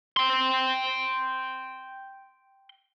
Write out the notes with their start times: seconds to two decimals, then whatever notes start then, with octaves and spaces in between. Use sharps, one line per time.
0.17 G5 C6